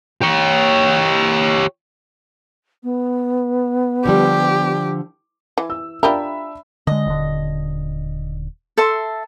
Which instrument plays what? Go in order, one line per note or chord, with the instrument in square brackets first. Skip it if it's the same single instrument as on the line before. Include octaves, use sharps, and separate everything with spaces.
[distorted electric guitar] G4 C#5
[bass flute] B3
[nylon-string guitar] D3 F3 G3 [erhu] G4
[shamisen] E3
[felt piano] E6
[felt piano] D4 E5 B5 [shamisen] F4 G4 A#4
[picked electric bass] D3 G#3 [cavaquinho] D#5
[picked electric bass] D#1 D3
[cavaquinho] A4 E5 C6